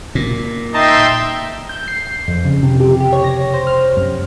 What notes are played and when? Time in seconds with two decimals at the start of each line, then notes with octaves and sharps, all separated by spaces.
0.15 A#2
0.74 D#4 E5 G5 A5 A#5 C6
1.69 G6
1.88 C7
2.28 F2
2.44 C#3
2.63 C3
2.80 G4
3.00 G4
3.13 C#5
3.24 A#6
3.54 C5
3.67 F6
3.97 F#2